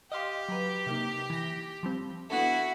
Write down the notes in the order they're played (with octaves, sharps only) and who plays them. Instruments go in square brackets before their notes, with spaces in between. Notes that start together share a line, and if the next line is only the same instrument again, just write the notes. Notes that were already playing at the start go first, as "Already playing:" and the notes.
[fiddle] G4 [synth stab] D#5 F5 C6
[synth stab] F#3 B4
C3 A#3 D#4
E3 A#6
F3 G3 C4
[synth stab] B3 D4 A4 [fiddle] E4 F#4